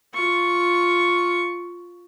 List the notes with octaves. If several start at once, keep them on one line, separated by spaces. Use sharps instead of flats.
F4 C#6